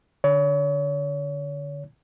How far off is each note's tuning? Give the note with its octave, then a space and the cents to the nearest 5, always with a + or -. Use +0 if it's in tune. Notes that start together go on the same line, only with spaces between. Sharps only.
D3 +0 C#5 +35